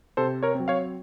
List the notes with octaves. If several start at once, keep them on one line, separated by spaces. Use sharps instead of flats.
C3 A4 C5
A#4 C#5
F#3 C4
C#5 F5